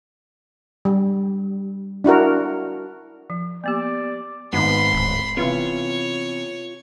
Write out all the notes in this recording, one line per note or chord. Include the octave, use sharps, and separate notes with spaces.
G3
D4 E4 F#4 A#4
F3
A#3 B3 G4 D5
G#1 G#2 B3 B5 C6
D1
C3 E3 B3 F4 C#5